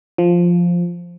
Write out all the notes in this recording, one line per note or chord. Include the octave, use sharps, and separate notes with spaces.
F3